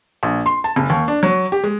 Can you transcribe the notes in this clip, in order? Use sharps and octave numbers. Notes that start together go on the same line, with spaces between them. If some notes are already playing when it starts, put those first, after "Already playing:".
A#1
C6
A5
F#1
D#2
D4
F#3
G4
G#3